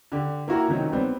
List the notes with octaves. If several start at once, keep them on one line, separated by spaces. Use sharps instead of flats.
D3 G4
A#3 E4 F#4 G4 A#5
C3 D#3 F#3 C#4 D#4
G3 B3 C4